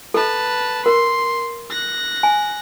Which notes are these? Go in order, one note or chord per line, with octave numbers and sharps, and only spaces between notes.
A4 B4 A5
A#4 C6
F#6 A#6
G#5